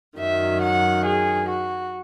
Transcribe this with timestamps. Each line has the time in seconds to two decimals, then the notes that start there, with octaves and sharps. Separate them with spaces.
0.19 F#2 D#3 F#3 E5
0.60 F#5
1.05 G#4
1.47 F#4